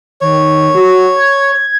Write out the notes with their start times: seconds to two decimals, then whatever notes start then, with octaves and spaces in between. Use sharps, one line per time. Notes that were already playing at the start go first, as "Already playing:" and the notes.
0.21 D#3 C#5
0.75 F#4
1.16 G#6